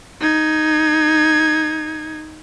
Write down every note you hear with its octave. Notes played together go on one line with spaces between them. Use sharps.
D#4 G#6